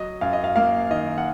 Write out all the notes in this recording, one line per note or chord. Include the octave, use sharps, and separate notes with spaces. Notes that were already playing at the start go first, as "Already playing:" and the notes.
Already playing: F#3 D#5
F#2 F5
D#5
F5
A#3 F5
D#3 D#5
F#5